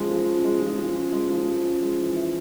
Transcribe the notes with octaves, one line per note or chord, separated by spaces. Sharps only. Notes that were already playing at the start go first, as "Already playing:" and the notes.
Already playing: F3 G#3 C#4
F3
C#4
G#3
F3
F3
C#4
G#3
F3
F3
C#4
G#3
E3
E4